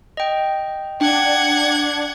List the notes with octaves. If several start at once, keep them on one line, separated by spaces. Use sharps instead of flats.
D#5 G5
D4 F#5 G5 G#6